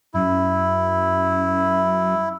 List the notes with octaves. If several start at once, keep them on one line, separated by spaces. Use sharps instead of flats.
F#2 E4